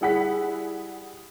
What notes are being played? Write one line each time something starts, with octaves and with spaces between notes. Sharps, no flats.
G3 E4 G#4 F#5 B5 B6